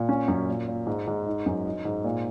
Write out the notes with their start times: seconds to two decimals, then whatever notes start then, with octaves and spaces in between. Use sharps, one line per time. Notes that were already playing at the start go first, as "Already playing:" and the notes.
Already playing: A#2
0.09 C#4
0.28 F#2
0.48 A#2
0.68 A#2
0.87 G#2
1.07 G#2
1.27 D#4
1.46 F#2
1.66 D#4
1.85 G#2
2.04 A#2